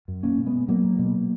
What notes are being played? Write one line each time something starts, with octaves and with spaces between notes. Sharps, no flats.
F#2
B2 A#3 C#4
B2
G#3 B3
B2
B2 F#3 A#3
B2
B2